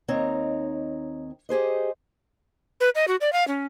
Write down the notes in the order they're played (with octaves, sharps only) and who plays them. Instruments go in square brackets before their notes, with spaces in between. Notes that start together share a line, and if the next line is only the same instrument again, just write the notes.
[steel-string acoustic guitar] D#2 C4 D#4 C#5 A#5
G4 G#4 C5 D#5
[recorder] B4
D#5
F#4
D5
F5
C#4